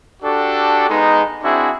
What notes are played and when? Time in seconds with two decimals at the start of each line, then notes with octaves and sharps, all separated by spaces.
0.22 D4 F#4 G4 A4
0.89 G#3 B3 D#4
1.42 C4 D4 E4 F#4 G#4